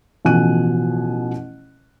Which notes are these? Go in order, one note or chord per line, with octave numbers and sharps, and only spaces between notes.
A1 B2 F3 G#5 F#6 D#7